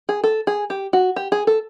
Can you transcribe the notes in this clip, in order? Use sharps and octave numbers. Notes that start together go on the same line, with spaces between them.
G#4
A4
G#4
G4
F#4
G4
G#4
A4